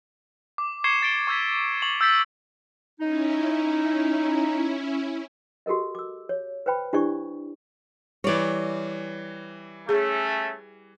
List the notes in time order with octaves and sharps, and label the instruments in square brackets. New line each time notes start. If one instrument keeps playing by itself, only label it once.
[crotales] D6
C#6 G#6 C7 C#7 E7 G7
C#6 A6 C7 D7 G7
C#6 E6 G#6 B6
C#6 F7 F#7
E6 G6 A6 B6
[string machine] C#4 E4 [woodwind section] D#4
[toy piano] F#4 G4 A4 A#4 D#5
D6 E6
C#5
B4 C5 G5 B5
D4 E4 G4 C5 D5 C#6
[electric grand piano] E3 G3 [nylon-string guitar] C#5 D5
[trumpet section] A3 C#4 [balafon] G#4